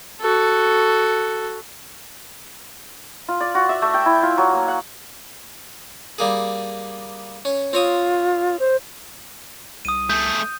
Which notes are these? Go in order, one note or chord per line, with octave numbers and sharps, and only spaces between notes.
F#4 A4
F4
D5
F#4
E5
A3
G5
E4
F4
F#3
A#3
F#5
G3 A#3 G#4
C#4
C4 F4 C#5 D#6
C5
C2 D#6 D#7
A3 G#4 G6